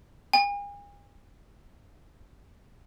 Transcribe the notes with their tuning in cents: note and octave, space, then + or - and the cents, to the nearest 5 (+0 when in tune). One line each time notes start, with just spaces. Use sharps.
G#5 -40